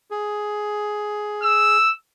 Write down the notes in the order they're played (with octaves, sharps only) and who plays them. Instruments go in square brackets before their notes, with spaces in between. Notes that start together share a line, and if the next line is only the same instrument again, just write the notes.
[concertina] G#4
[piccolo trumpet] E6